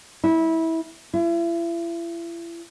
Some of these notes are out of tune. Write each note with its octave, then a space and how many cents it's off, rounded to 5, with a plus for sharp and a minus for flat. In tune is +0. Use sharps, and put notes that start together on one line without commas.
E4 -20
E4 +40